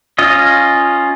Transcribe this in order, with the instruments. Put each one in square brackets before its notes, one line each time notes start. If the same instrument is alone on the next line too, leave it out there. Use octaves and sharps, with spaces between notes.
[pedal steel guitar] C#4 F4 D#5